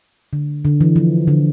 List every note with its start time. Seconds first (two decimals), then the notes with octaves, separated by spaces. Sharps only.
0.33 D3
0.65 D3
0.81 E3
0.96 F3
1.28 D3